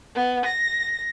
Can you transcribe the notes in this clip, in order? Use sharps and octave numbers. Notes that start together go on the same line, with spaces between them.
B3
A#6